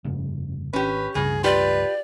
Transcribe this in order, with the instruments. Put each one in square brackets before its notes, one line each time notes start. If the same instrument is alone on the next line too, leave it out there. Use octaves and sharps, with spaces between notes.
[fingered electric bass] F1 G2 C#3
[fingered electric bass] G#1 [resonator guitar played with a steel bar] C#4 G4 [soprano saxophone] B4
[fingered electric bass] C#2 G2 [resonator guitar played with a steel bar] C#3 [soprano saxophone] G#4
[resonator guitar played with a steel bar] F4 G4 [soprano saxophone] B4 [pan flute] D5